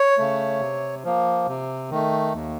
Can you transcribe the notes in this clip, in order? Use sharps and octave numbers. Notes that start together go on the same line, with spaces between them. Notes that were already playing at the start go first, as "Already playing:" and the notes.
Already playing: C#5
C#3 A3
C3
F3 A#3
C3
D#3 A3
D#2